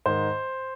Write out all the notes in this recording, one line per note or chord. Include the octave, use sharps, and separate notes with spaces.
G#2 D#3 C5